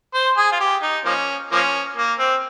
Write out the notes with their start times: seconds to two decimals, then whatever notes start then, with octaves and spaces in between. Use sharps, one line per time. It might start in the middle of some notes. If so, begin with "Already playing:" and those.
0.14 C5
0.37 G#4
0.52 F4
0.60 G4
0.82 D#4
1.05 F3 A#3 C#4
1.52 F3 A#3 C#4
1.97 A#3
2.19 C4